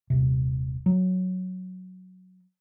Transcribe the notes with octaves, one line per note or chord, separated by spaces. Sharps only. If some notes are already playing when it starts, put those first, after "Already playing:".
D#1 C3
F#3